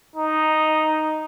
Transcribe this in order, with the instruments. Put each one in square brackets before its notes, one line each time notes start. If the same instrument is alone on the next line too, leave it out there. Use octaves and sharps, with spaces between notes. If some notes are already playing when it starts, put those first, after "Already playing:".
[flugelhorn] D#4